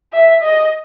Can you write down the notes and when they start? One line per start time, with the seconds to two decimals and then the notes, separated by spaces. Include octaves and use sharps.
0.13 E5
0.42 D#5